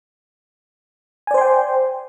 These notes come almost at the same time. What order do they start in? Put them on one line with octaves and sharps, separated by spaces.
G#5 D5 C5 C6 G5